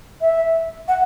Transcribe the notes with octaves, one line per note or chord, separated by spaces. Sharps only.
E5
F#5